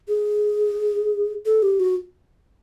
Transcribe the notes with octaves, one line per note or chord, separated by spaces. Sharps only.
G#4
A4
G4
F#4